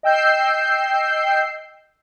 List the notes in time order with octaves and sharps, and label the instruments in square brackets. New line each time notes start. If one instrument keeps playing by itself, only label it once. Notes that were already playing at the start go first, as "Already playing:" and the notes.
[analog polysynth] D#5 G5 E6 G6 C7